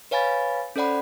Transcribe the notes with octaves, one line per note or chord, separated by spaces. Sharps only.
B4 C#5 F5 G#5 B5 A6
C#4 A4 C5 D5 F#5 B5